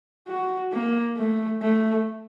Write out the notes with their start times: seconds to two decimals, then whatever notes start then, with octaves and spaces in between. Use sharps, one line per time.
0.28 F#4
0.72 A#3
1.17 A3
1.62 A3